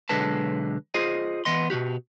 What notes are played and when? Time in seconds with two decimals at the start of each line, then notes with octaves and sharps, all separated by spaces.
0.09 B1 D3 G#3 B4 A5
0.94 F4 G#4 C5 D#5
1.45 E3 B3 D#5 C6
1.70 B2 D#3 F#4 G4